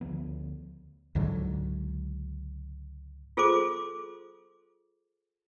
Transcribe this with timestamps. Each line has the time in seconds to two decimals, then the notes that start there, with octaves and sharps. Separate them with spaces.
0.01 D2 F3 F#3 B3
1.15 C#2 G#2 D3 F#3
3.37 F4 G#4 A4 C5 C6 D6